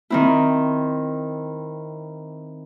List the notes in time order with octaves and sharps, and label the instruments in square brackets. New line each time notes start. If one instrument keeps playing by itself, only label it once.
[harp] D#3 C4 E4